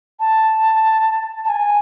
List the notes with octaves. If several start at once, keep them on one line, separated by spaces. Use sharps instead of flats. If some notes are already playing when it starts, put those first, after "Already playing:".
A5
A5
G#5